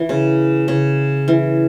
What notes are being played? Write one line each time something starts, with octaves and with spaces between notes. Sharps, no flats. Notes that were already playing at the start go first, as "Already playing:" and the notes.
Already playing: E3
C#3
C#3
E3